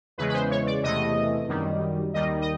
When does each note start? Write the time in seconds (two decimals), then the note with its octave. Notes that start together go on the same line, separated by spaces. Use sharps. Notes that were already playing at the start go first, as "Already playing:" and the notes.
0.18 E2 C#3 E3 G#3 B4
0.29 B4
0.34 C5
0.50 C#5
0.66 D5
0.83 E2 C3 E3 A3 D#5
1.48 F#2 D#3 G3
2.14 D#2 D#3 G3 D#5
2.41 D#5